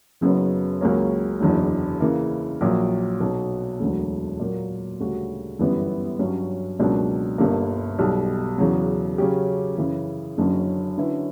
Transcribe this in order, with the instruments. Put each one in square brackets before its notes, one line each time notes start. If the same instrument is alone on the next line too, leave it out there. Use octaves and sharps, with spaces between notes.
[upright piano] F#1 F#2 C#3 F#3 B3
C#2 C#3 F#3 A#3 C#4
F#1 E2 D3 F#3
C#3 E3 A#3
A#1 A#2 F#3
B1 B2 F#3
E1 D2 D3 F#3
A#2 F#3 A#3
D2 C#3 G3 C#4 F#4
G1 F#2 E3 G3 B3
G2 F#3 C#4 G4
C#2 B2 F#3 A#3 D4
G1 G2 D3 A#3
B1 B2 G3
E2 C#3 F#3
C#3 F#3 C#4 G4
F#2 C#3 E3
F#1 F#2 D3 F#3 C#4
D3 F#3 C#4 E4 B4